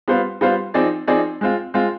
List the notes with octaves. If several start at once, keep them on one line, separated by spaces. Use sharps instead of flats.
G3 B3 F4 C5 F5
G3 B3 F4 C5 F5
F3 C4 D#4 G#4 D5
F3 C4 D#4 G#4 D5
G#3 C4 F4
G#3 C4 F4